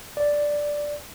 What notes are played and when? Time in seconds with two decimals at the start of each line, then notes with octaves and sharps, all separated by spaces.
0.17 D5